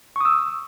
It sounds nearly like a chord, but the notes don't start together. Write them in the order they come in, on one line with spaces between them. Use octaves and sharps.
C#6 D#6 E6